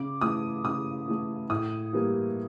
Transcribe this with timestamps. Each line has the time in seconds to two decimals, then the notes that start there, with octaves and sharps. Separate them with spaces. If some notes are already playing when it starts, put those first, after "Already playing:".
Already playing: C#3 D6
0.21 E3 A3 D#6
0.65 C#3 D#6
1.08 E3 A3
1.50 A2 D#6
1.93 E3 G3 A#3